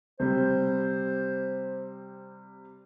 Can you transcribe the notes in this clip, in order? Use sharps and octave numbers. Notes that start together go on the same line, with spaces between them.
C3 G3 C5